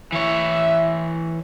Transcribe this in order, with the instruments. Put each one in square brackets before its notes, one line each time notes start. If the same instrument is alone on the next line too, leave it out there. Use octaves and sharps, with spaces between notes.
[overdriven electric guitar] E3 C#5 [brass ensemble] E4 E5